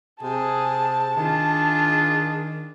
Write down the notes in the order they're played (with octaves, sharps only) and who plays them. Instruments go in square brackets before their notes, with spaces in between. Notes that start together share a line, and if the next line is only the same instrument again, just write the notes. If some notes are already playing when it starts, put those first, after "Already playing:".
[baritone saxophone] C3 [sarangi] G#4 [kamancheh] A5
[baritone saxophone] D#3 [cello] D4 F4 [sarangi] G#4